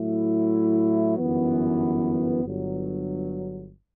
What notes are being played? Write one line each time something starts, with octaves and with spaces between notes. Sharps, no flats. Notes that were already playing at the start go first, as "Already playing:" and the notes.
Already playing: A2 F#3 A3 E4
G1 F#2 E3 B3
G1 G2 F#3